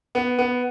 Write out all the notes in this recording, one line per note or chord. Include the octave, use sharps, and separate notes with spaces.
B3
B3